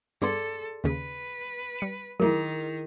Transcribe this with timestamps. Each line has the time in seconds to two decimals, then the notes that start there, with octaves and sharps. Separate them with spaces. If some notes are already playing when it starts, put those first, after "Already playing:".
0.22 G2 B3 G#4 A4 D5 C6
0.84 D#2 C#3 B4
1.79 G3 C#7 D#7
2.20 D#3 F#3 A3 E4 G#4 A#4